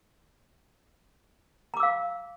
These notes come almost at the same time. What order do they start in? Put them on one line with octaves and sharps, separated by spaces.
A#5 D6 E6 F5